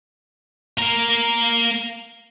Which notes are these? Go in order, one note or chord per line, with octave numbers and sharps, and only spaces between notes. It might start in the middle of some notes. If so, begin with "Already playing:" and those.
A#3 A#4